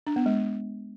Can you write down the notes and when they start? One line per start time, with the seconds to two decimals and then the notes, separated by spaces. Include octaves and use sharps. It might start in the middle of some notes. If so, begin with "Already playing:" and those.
0.07 D4
0.16 B3
0.26 G#3